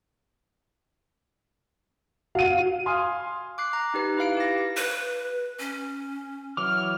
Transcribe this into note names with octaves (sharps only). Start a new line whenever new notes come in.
F#4 F5 D#7
F5 G#5 C6 D#6 F6
D6 F#6 C7
A#5
D#4 G4 B4
E4 B4 F5 D7
G4 A#6
B4
C#4
E3 F#3 D6 F6